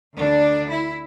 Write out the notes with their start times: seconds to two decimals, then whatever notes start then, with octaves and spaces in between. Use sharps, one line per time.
0.15 D2 D3 D4
0.70 E4